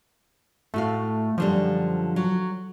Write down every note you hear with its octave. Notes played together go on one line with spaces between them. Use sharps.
A2 A3 F#4 F5
F#2 D3 F3 G3
F#3